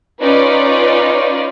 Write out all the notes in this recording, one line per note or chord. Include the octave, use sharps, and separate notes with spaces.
C#4 D#4 F4 B4 D5